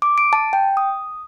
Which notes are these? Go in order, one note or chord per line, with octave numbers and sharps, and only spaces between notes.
D6
D7
A5
G5
D#6